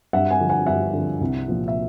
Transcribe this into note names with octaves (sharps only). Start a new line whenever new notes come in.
G2 E5 F#5
F#5 G#5
D3 F3
F#5 G#5
G2 E5 F#5
D3
F3
C2
A#2 F3
E5